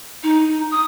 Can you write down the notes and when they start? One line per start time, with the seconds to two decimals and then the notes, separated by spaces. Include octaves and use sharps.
0.23 D#4
0.71 D#6